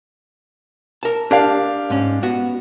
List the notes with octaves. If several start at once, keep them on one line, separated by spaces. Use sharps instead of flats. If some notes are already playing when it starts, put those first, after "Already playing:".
A#4 A5
D4 G4 A#4 D5 F5
G#2 C#4
B3 F#4